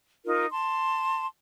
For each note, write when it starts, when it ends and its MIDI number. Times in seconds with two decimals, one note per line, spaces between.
0.25 0.45 63
0.25 0.45 65
0.25 0.45 70
0.51 1.27 81
0.51 1.27 84